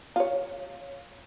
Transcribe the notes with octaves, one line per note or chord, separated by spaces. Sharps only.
F4 C#5